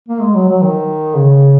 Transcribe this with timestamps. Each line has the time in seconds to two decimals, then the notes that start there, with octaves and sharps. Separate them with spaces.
0.09 A#3
0.21 G#3
0.35 F#3
0.49 F#3
0.62 D#3
1.17 C#3